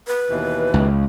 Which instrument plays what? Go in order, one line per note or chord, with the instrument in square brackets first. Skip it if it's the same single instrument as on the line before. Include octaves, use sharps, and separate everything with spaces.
[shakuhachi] B4
[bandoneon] D#2 B2 E3
[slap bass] C#2